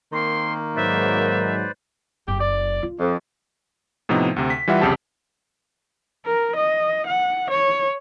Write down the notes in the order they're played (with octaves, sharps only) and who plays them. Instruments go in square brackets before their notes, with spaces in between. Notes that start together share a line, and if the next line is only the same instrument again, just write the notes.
[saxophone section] D#3 A#3 [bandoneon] C4 [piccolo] C6
[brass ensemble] G#2 F#3 [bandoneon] B4 C5 D5 [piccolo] E5
[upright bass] F#1 [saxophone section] G4
[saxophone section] D5
[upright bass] F4
[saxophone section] F2
[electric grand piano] A2 C3 F3 B3 D#4
D2 C3
B6
E3 G3 F4 E5 F#5
C2 F2 C#3 G4 A5
[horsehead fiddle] A#4
D#5
F#5
C#5